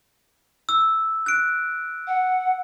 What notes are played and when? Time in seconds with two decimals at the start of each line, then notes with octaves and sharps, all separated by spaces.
0.69 E6
1.26 F#6 D7
2.07 F#5